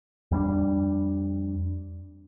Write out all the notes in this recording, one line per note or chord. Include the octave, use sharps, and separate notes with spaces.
F2 G3 C#4 D4